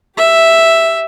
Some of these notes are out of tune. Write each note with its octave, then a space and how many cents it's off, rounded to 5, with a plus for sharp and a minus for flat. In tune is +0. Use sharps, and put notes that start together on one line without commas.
G4 +0 E5 +0